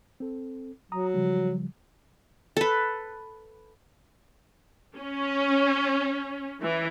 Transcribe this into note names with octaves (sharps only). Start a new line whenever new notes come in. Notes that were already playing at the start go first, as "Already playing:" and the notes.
C4 A4
F#3 A#5 D#6
C#3 F3 G3
A4 B4
C#4
E3